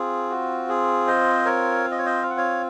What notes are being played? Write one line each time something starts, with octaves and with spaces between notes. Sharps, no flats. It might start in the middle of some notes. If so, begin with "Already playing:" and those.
Already playing: C4 F4 G#4
F#4
G#4
C5 D#5
A#4 C#5
F5
D#5
C#5
C5 D#5
F5
F#5
C#5 F5